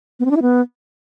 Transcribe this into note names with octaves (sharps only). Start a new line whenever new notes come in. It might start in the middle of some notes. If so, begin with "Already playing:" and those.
B3
C4
D4
E4
B3